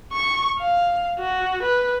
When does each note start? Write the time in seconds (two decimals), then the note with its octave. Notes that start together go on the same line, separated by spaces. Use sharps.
0.12 C#6
0.59 F5
1.19 F#4
1.63 B4